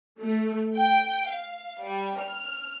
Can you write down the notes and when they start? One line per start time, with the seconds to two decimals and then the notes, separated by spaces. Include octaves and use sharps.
0.20 A3
0.76 G5
1.29 F5
1.84 G3
2.18 F6